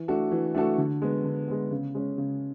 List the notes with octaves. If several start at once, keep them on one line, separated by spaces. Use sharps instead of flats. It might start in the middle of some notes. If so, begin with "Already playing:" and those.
Already playing: E3
A3 D4 F#4 A4
E3
A3 D4 F#4 A4
D3
G#3 B3
D3
G#3 B3
C#3
G#3 C#4
C#3